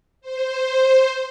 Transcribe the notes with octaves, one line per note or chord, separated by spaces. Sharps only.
C5